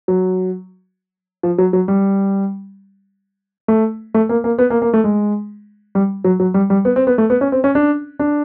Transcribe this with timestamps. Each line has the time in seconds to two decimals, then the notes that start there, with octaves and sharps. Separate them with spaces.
0.08 F#3
1.43 F3
1.58 F#3
1.73 F#3
1.88 G3
3.68 A3
4.14 A3
4.29 A#3
4.44 A#3
4.59 B3
4.70 A#3
4.82 A#3
4.93 A3
5.04 G#3
5.95 G3
6.24 F#3
6.40 F#3
6.54 G3
6.70 G3
6.85 B3
6.96 C4
7.07 B3
7.18 A3
7.30 B3
7.41 C#4
7.52 C4
7.64 C#4
7.75 D4
8.19 D4